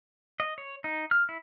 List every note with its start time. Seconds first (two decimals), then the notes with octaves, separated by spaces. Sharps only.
0.40 D#5
0.58 C#5
0.84 D#4
1.11 F6
1.29 E4